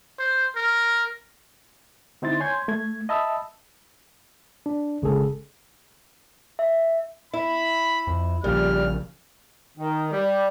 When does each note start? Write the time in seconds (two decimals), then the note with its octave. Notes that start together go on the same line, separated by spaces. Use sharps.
0.19 C5
0.56 A#4
2.22 D3 C4 D#4 E4 C6 A6
2.40 C#5 G#5 C6 G6 G#6
2.68 A3 G#6
3.09 D#5 E5 A5 B5 D#6 E6
4.66 D4
5.02 G1 C#3 G#3 C#4 G#4 A4
6.59 E5
7.34 E4 B5
8.07 F2
8.44 A#1 A#2 C#3 F3 G3 F6
9.78 D#3
10.12 G3